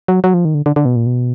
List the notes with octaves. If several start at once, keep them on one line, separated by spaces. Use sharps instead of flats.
F#3
F#3
F3
D#3
D3
D3
D3
B2
A#2
B2